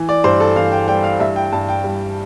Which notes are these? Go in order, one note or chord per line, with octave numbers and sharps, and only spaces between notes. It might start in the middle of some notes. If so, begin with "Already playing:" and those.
Already playing: E3
D5
G2 C5
A4
E3 F5
G5
G3 G5
F5
G2 E5
G5
G2 A5
G5
G3